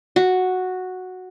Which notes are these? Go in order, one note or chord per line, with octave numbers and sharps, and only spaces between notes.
F#4